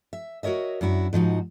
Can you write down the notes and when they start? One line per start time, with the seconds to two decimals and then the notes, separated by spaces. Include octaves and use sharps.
0.13 E5
0.43 F#4 A#4 C#5 D#5 E5
0.81 F#2 D4 E4 F#4
1.13 G#2 F3 D#4 F#4